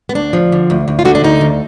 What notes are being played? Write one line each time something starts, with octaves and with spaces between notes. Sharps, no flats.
B3
D2 D4
F3
D3
D2
D2
F4
D3 F#4
D4
D2 D#4
D2